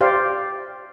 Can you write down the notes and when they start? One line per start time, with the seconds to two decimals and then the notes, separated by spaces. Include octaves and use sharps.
0.01 G4 C5 D5 F5